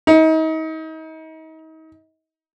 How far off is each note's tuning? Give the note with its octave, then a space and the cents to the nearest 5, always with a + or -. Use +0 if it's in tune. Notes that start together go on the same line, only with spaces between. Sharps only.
D#4 +35